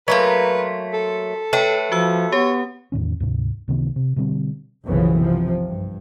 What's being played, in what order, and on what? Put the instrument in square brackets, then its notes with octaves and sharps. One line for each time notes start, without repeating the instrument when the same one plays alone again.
[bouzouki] F#3 A3 A#3 [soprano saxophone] B4 [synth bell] C6 B6
[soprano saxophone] A4
[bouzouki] A3 B4 [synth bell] C#5 G5
[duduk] F3 [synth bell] F#4 E6
[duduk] B3 [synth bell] G4 [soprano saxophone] C#5
[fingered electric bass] E2 A2 D#3 C#4
D2 G#2 C3
C#2 C3 D#3 B3
C3
B2 D3 G3 C4
[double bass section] F#1 B1 C#3 E3 F3 B3
C3 F3
G2